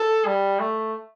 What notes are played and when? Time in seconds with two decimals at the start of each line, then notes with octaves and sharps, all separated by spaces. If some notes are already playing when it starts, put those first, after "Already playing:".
Already playing: A4
0.25 G3
0.59 A3